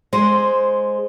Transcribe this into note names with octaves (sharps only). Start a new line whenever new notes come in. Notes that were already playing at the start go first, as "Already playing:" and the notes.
G#3 C5